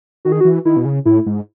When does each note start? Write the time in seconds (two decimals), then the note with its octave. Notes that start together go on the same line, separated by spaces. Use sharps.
0.25 D#3 F#4
0.32 G#4
0.40 F#4
0.45 E3
0.65 D#3 E4
0.76 B2
0.85 C#3
1.05 A2 E4
1.26 G#2